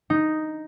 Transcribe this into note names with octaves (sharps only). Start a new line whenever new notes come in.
D#4